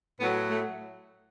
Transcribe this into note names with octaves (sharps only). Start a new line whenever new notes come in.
A2 F#3 B3
A3